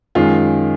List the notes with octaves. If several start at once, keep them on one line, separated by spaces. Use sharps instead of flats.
F#2 D#3 G#3 F4